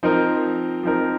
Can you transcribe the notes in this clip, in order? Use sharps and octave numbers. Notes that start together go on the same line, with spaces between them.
F3 C4 D#4 A#4
F3 C4 D#4 A#4